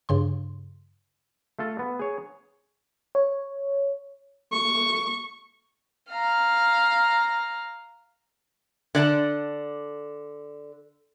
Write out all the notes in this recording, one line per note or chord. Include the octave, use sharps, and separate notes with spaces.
G2 C#3 C6
A3 F4 A4
B3
G#4 C#5
C#5
C#6
F5 A#5
D3 D5 A5